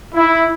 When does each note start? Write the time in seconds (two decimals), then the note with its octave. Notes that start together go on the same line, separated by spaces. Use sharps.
0.14 E4